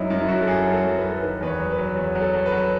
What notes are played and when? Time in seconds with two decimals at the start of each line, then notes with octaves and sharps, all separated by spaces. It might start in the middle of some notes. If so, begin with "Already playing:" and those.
Already playing: F#2 F#3 D#4 E4
0.10 F#2 E4
0.21 E4
0.28 F#2 F#4
0.42 A4
0.47 F#2 G#4
0.66 F#3
0.73 A4
0.84 F#2
0.97 B4
1.03 F#3
1.11 A4
1.22 D#3 B4
1.41 E2 B4
1.47 C#5
1.59 F#3
1.72 B4
1.78 F#3
1.96 E2
2.15 F#3
2.21 A4
2.33 F#3
2.46 B4
2.52 F#3